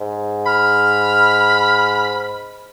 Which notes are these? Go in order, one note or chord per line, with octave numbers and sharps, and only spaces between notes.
G#2
B5 F6